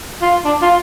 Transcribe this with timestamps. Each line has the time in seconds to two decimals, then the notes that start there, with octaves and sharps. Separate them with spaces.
0.22 F4
0.45 D4
0.62 F4